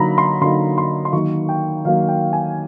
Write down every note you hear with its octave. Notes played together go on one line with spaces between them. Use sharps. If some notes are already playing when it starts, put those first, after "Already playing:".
Already playing: D3 F#3 A#3 D#4 A#5 B5
C6
D3 F#3 A#3 D#4 C6
C6
C6
D#3 F#3 A#3 C#6
G5
D#3 F#3 A#3 F5
G5
G#5